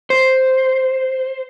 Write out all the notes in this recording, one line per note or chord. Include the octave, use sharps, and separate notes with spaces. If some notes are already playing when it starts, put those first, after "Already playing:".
C5